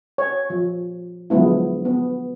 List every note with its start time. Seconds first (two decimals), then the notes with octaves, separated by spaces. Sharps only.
0.18 C#5
0.50 F3
1.30 D3 F3 F#3 G#3 B3 E4
1.85 B3